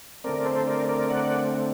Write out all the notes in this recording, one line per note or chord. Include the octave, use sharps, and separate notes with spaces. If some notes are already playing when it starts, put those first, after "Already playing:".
D3 A3 C4 A#4 D5
A4 C5
A#4 D5
A#4 D5
D5 F#5